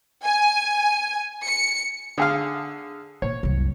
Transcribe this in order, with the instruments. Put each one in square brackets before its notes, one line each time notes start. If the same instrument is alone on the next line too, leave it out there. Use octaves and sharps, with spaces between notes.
[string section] G#5
C#7
[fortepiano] D3 G#4 F5
[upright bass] A#2 [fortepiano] C#5
[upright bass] C2 F#2